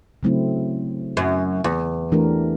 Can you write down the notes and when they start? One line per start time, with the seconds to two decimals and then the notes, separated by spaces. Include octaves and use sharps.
0.23 C#3 F#3 A3 C4 E4
1.17 F#2
1.64 E2
2.12 E3 A3 D4 G4 A#4